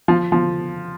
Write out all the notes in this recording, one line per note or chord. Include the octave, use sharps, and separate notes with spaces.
F3
F3